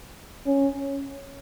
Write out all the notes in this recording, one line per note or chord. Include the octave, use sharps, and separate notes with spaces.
C#4